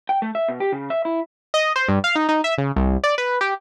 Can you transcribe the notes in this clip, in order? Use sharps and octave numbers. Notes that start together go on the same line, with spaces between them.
G5
A3
E5
B2
G4
C#3
E5
E4
D#5
C5
G2
F5
D#4
D#4
E5
C#3
C2
D5
B4
G4